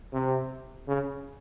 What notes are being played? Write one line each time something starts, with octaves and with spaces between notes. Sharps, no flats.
C3
C#3